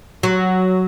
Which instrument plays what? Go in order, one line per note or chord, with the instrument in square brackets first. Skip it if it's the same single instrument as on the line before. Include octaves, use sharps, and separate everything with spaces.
[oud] F#3